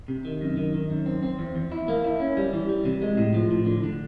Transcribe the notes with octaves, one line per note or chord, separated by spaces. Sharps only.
C3
D#3
F#2
D#3
D#3
F#2
C4
C4
E2
E2
E4
A#3
E4
C#4
G3
E3
G3
C3
G#3
A2
F3
A2
D3
D3